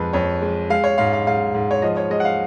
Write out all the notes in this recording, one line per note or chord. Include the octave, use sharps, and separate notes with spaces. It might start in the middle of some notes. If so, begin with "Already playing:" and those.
Already playing: F2 G#3 B4
F2 C#5
G#3
G#3 F5
C#5
G#2 F5
F5
G#2 F5
G#2
C#5
F3 D#5
C#5
G#3 D#5
F#5
F5